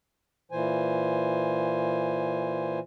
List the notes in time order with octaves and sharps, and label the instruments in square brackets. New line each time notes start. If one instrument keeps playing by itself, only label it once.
[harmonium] A#2 E3 C5 G#5